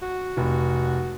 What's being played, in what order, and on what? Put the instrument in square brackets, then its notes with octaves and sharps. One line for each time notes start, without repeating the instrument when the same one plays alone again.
[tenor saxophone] F#4
[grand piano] F1